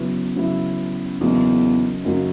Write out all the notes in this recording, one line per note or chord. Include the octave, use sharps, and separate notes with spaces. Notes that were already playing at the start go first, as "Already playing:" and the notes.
Already playing: C#3 F#3 B3 E4
C#3 F#3 B3 E4
E2 C#3 F#3 A#3 D#4
F#2 C#3 F#3 A#3 D#4